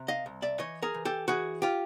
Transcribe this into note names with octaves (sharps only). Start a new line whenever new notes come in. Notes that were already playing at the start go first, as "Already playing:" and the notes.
Already playing: C3
D#5 F5
C2
D5 E5
E3 C#5 D#5
G#4 A#4
E3
G4 A4
E3 F#4 G#4
F4 G4